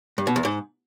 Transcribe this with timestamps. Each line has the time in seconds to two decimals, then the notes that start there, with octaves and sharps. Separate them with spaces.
0.18 G2
0.27 B2
0.36 E2
0.45 G#2